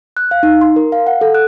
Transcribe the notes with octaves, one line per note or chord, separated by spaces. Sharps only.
F#6
F5
D#4
C6
A#4
F5
F#5
A4
F#6